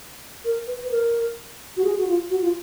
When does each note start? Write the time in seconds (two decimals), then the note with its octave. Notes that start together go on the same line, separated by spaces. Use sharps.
0.45 A#4
0.67 B4
0.85 B4
0.91 A#4
1.77 F#4
1.84 G#4
1.98 F#4
2.07 F4
2.30 F#4
2.42 F4